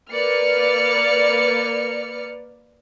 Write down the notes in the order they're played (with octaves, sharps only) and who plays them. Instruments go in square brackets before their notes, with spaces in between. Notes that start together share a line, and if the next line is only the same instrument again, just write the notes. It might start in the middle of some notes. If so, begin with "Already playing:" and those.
[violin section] A#3 B4 D5 F6 C#7